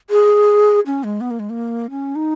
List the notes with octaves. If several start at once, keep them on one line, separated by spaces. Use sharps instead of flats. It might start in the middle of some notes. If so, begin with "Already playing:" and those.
G#4
C#4
G#3
B3
A#3
G#3
A#3
C#4
D#4